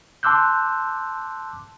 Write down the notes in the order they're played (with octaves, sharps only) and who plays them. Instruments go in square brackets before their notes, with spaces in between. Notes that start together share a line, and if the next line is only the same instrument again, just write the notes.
[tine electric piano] A5 C6 D6 E6 F#6 G6